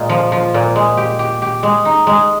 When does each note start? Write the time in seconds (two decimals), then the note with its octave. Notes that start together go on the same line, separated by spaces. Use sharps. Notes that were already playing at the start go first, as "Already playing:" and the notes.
Already playing: A#2 G#3
0.09 F3
0.32 F3
0.54 A#2
0.76 G#3
0.97 G4
1.19 G4
1.42 G4
1.63 G#3
1.85 D#4
2.07 G#3